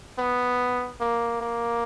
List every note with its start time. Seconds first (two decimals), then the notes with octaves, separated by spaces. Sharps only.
0.18 B3
1.00 A#3
1.41 A#3